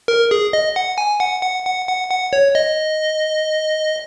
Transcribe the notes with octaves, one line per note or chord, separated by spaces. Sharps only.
A#4
G#4
D#5
F#5
G#5
F#5
F#5
F#5
F#5
F#5
C#5
D#5